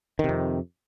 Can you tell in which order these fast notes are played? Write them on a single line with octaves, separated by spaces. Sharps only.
D#3 C3 F2